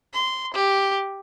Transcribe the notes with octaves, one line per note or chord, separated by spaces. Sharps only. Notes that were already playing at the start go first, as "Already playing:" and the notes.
C6
G4